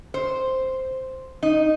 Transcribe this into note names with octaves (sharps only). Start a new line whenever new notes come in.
C5
D#4